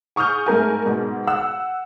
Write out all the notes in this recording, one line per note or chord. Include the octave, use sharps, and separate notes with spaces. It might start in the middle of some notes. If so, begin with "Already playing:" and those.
G#5 C#6 D#6 F6 G6
G#2 A3 A#4 G#5
G#2 B2
F#5 E6 F#6